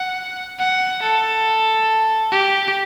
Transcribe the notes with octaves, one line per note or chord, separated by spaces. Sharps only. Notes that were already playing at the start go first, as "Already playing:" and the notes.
Already playing: F#5
F#5
A4
G4